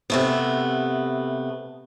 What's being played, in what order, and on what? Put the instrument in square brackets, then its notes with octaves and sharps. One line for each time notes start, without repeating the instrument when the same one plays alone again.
[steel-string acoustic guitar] C3 A3 B3